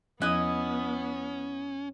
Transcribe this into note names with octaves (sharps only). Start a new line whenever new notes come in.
E2 F3 B3 C#4 E4 D#5 F#6